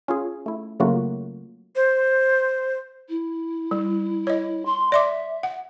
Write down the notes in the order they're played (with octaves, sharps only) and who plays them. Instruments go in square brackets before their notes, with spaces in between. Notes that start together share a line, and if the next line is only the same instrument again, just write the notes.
[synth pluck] C#4 F4 G#4
A3 E4
C#3 F#3 A3 A#3 F4 F#4
[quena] C5
[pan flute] E4
[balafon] G3
C#5 D#5
[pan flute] C6
[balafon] D5 C6 D6 [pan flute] E5
[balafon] F#5